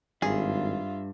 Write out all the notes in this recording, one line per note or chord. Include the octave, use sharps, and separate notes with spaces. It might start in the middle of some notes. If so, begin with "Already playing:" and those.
G#1 G2 F4 G#4 E5